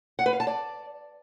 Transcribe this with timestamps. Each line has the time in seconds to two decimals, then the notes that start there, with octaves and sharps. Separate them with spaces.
0.19 F#5
0.26 B4
0.33 F5
0.40 A5
0.47 D5